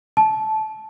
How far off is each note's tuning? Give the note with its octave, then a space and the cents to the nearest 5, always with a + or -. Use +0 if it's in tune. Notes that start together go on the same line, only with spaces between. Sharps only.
A5 -20